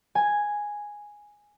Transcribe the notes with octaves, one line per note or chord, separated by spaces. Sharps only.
G#5